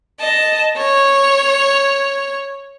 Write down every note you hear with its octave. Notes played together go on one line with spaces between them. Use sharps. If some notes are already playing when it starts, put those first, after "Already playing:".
D#5 A5
C#5